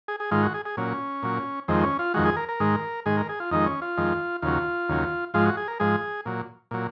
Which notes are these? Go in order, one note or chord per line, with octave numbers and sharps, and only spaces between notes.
G#4
G#4
G#2 D#3 G#3 F4
F#4
G#4
G#4
A#2 F#3 C#4
A#2 F#3
F2 D#3 G#3 C4
C#4
F4
F2 D#3 G#3 F#4
G#4
A#4
A#4
G#2 D#3 G#3
G#2 D#3 G#3 G#4
A#4
G#4
F4
F2 D#3 G#3 D#4
C#4
F4
F2 D#3 G#3
D#2 C#3 F#3 F4
D#2 C#3 F#3
G#2 F3 G#3 F4
F#4
G#4
A#4
G#2 F3 G#3 G#4
A#2 F#3
A#2 F#3